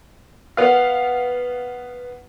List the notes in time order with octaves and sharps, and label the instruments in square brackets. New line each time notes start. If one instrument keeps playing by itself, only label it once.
[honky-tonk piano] B3 F5